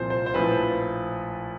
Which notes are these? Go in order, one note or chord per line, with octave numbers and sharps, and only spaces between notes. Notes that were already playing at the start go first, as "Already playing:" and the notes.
Already playing: C2 A#2 F3 C5
C5
C5
A#1 A2 F3 B4